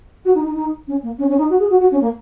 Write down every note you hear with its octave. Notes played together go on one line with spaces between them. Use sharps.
F#4
D#4
D#4
D#4
C#4
A#3
C#4
C#4
D#4
F#4
G#4
F#4
F#4
C#4
A#3